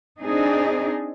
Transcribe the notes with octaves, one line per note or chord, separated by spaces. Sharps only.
C4 D4 D#4 G#4